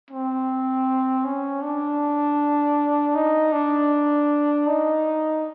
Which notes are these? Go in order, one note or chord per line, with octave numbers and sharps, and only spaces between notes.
C4
C#4
D4
D#4
D4
D#4